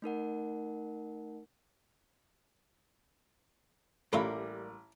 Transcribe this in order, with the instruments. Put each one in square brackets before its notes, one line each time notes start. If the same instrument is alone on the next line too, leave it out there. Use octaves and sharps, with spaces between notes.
[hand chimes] A3 D#4 A#4 F#5
[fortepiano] A1 B5 [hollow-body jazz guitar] G3 A#3 [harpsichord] A3 F4 E5